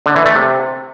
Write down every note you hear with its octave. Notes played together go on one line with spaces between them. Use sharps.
D3
E3
A3
C3